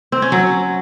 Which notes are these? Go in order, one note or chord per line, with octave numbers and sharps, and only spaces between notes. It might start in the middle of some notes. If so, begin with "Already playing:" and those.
C4
C#4
F#3